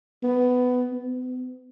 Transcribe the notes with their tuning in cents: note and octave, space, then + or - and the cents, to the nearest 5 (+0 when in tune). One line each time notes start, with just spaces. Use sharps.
B3 +15
B3 +40